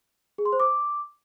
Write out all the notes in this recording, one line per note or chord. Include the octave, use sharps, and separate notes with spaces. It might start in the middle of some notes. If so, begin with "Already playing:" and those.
G#4
C6
C5
D6